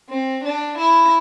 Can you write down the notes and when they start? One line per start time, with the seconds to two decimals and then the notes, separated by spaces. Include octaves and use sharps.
0.09 C4
0.44 D4
0.78 E4